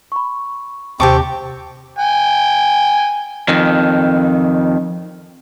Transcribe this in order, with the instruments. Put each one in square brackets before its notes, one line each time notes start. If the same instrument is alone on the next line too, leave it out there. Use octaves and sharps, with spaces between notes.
[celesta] B5 C#6
[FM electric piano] D#2 C3 [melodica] C4 C#6 [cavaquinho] G4 A5 D6
[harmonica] G5 G#5
[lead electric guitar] F2 D#3